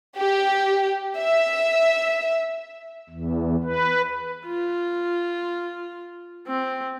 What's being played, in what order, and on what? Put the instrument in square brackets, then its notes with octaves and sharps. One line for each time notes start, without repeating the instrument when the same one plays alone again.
[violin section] G4
E5
[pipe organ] E2
B4
[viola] F4
C4